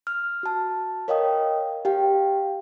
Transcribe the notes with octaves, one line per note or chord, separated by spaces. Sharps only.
F6
F#4 A5
A#4 C#5 D#5 F5 G5 D#6
G4 F5 G5